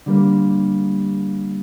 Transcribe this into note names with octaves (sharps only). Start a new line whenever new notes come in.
D3 G3 A#3